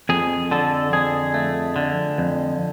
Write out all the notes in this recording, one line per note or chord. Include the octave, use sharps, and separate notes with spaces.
F2 G#4
D3 A4
F2 G#4
A3
D3
F2